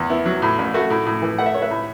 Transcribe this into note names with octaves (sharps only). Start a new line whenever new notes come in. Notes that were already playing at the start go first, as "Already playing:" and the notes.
Already playing: E2
B3 E4
F#3
A2
A1
A3 F#4
A2
A2
E3
A3 F#5
E5
A3 C#5
B4 E5
A2